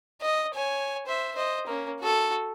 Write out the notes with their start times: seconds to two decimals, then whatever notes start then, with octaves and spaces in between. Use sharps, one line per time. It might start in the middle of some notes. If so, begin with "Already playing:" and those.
0.22 D#5
0.54 C#5 G#5
1.06 C5 E5
1.35 C5 D#5
1.67 A#3 C#4
2.00 F#4 A4